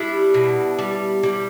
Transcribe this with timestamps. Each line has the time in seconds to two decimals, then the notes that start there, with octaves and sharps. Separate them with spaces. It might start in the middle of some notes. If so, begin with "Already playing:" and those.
Already playing: G3 D4 E4
0.34 B2
0.79 G3
1.23 G3